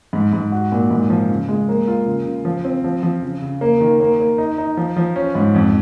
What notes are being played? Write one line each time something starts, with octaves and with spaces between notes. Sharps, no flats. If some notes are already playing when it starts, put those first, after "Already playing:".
G#2
G#2
F#4
A#2
G#2
F3
C#3
G#3
A#3
F4
C#3
C#3
F3
C4
F3
F3
C#3
C#3
A#3
D#3
A#3
A#3
D#4
D#4
F3
F3
C#4
G#2
F2